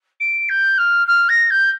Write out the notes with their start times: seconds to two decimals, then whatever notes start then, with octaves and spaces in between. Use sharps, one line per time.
0.20 D7
0.49 G6
0.78 F6
1.07 F6
1.29 A#6
1.50 G6